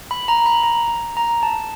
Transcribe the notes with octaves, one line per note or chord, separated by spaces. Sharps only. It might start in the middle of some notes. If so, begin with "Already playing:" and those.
B5
A#5
B5
A#5
A#5
A5